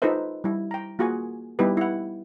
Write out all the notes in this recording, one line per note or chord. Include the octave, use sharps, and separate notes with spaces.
D#4 F4 A4 B4 C5 E5
G3 E4
G5 A#5
A#3 F4 F#4 G#4 F#5 G#5
G3 B3 D#4 E4 G4 B4
E4 F#5